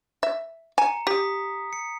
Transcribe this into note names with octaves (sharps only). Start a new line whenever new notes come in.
E5
G#5 A#5 C#7
G4 D#6 B6
C#7